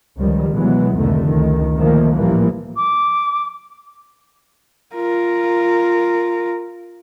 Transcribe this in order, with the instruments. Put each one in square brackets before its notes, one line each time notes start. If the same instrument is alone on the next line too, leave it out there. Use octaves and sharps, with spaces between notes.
[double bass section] C#2 D#3 F3 G3
B2 E3 F#3 G#3 B3
F1 C#2 D3 D#3 A3
C#2 D#3
A#2 D3 D#3 F3 A3 A#3
A1 A#2 E3 F3 G3 A#3
[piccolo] D6
[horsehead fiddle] F4 A#4